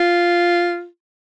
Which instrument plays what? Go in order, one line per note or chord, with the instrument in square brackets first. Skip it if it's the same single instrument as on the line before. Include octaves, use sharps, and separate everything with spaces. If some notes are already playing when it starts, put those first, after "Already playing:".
Already playing: [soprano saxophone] F4